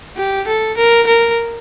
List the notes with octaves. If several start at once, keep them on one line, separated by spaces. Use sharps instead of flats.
G4
A4
A#4
A#4